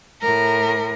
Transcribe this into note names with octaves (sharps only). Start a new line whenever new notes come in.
A2 A#4